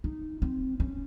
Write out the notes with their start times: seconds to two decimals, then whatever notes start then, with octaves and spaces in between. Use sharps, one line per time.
0.04 D#4
0.42 C4
0.80 C#4